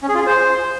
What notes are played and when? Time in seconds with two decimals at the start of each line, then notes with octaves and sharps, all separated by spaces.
0.03 C#4
0.09 G#4
0.15 F4
0.21 G#4
0.27 C5